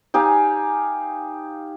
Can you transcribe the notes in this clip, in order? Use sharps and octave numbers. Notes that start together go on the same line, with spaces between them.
D#4 G4 F5 G#5